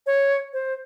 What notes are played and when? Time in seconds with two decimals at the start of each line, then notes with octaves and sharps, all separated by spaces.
0.06 C#5
0.53 C5